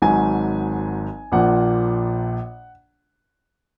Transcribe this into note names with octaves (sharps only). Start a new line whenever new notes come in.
G#1 G#2 F#3 G#5
A#1 A#2 F3 F#5